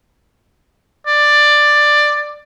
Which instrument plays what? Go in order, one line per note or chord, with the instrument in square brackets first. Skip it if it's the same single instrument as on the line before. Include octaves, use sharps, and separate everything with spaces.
[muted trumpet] D5